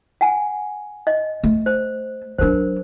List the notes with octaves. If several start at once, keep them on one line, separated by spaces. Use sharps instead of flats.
F#5 G#5
D#5
A3
C5
F#3 D4 A#4 C5